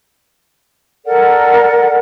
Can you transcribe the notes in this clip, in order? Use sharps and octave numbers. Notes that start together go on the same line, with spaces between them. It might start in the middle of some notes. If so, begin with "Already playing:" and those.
A4 A#4 D5 F#5